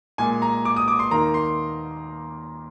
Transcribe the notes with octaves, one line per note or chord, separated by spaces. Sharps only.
A#2 G#3 G#5
A#5
D6
D#6
D6
C6
D#2 D#3 A#3 A#5
C6